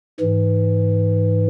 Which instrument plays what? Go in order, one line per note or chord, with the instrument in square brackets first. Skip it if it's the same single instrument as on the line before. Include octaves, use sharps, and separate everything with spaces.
[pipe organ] G#2 E3